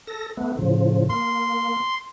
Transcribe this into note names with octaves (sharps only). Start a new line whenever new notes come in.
A4 A#6
A3 B3
A2 C#3 F3
A#3 C6